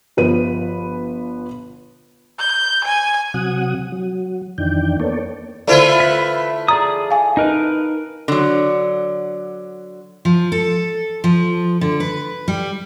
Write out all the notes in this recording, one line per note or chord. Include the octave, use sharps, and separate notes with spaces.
G1 F3 B4 D#7
G6
G#5
C3 F#3 F#5 D#6
F#3
F2 D#3 E3 D4 G5
A#3 B3 A4 C#5 D5
D3 A3 E4 F4 C5 D5
B4 E5
G#4 D5 A#5 D#6
F5 G#5
D#4 A#4 B4 D#5
D3 F#3
F3
A4
F3
D3
B4
G3